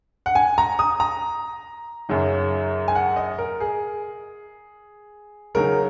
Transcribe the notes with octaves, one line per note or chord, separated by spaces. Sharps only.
F#5
G#5
A#5
D#6
A#5
F#2 C#3 F#3 D#4
G#5
F#5
D#5
A#4
G#4
C#3 F#3 D#4 A#4